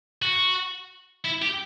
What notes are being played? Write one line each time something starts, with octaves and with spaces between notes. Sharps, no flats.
F#4
E4
G4